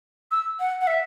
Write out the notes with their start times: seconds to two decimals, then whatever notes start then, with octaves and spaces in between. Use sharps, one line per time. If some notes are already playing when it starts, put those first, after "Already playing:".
0.32 E6
0.60 F#5
0.81 F#5
0.87 E5